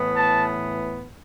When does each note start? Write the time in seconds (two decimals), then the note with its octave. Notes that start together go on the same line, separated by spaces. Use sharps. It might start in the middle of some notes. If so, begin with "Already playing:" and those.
Already playing: A2 E3 B3
0.16 A5